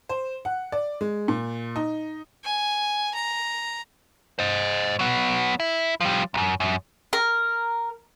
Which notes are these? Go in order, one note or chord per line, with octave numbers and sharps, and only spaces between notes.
C5
F#5
D5
G#3
A#2
D#4
G#5
A#5
C5 D#5
F#3 B3
E4
F3 G3
B1 F#2
F#2
A#4